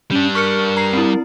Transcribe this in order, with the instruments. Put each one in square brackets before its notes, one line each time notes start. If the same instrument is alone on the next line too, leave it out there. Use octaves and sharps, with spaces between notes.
[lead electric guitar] G3 D4 [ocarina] C#4
[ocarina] A#4 [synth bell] C#6 F6 C#7
[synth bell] A#5 C7
C4 E4